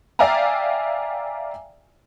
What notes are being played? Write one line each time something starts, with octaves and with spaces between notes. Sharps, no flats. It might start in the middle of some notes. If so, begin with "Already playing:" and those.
D5 E5 F5 G5 G#5 A#5